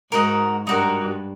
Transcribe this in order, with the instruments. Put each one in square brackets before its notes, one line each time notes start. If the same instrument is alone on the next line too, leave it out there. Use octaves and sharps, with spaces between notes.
[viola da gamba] G#2 [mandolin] D#4 F#4 A#4
[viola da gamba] G2 [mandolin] D#4 F#4 A#4